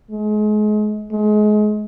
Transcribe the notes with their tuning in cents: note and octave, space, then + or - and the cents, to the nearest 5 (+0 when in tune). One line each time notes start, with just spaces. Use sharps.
G#3 +35
G#3 +30